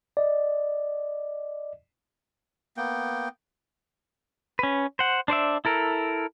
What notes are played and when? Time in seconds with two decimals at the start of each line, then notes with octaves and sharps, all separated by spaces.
0.17 D5 D#5
2.77 A#3 B3 G5
4.59 C#4 B4
4.99 C5 F#5
5.28 D4 C5 D5 E5
5.65 E4 A4 A#4